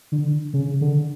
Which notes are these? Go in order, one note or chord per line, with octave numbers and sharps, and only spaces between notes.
D3
C#3
D3